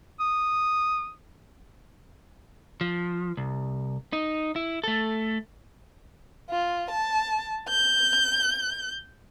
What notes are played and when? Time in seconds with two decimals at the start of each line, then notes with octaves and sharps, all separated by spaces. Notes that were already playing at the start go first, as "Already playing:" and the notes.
0.20 D#6
2.81 F3
3.37 C2
4.13 D#4
4.56 E4
4.84 A3 A4
6.50 F4
6.91 A5
7.69 G6